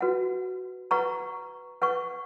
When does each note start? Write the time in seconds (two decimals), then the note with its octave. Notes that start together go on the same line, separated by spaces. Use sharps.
0.01 F#4 B4 F#5
0.91 B4 F#5 A#5 C#6
1.82 B4 F#5 C#6